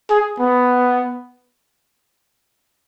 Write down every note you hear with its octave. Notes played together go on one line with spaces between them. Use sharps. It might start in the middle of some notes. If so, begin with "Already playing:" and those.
G#4
B3